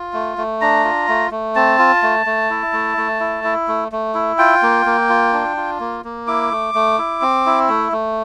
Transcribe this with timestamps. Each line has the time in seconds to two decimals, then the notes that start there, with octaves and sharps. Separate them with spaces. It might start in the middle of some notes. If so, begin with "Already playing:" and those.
Already playing: F4
0.13 A3
0.38 A3
0.61 D4 A#5
0.84 F4
1.08 A3
1.31 A3
1.55 C4 A5
1.79 F4
2.03 A3
2.26 A3
2.50 E4
2.73 A3
2.97 A3
3.20 E4
3.44 E4
3.68 A3
3.92 A3
4.14 E4
4.38 F4 G5
4.63 A#3
4.86 A#3
5.09 F4
5.33 D4
5.57 F4
5.80 A#3
6.04 A#3
6.27 E4 D6
6.51 A3
6.74 A3
6.98 E4
7.22 C4
7.46 E4
7.69 A3
7.92 A3